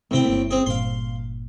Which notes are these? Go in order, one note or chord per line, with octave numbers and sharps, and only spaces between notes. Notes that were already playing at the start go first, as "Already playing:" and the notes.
A2 C3 B3 C4 G5
G1 A#3
C4 G#4
G1 A#2 F5 C6